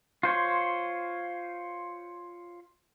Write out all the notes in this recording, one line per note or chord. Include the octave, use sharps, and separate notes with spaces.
F4 C5 C#5